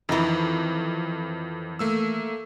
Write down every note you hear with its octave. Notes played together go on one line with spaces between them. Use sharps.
F2 D#3 E3
A3 A#3 E6